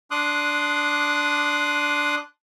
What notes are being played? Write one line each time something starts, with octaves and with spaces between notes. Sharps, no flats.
D4 C6 D6 D#6 F#6